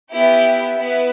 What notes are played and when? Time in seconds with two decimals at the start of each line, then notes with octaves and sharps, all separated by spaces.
0.11 B3 E4 G4
0.77 B3 E4 B4